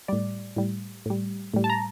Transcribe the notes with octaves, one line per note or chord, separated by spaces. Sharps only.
A2 G3 D5
A2 G3
A2 G3
A2 G3
A5
A#5